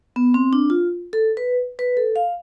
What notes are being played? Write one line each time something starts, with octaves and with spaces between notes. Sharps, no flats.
B3
C4
D4
F4
A4
B4
B4
A4
F5